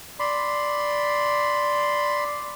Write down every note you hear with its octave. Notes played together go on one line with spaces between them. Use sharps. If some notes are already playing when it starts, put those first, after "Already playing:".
D5 B5 C6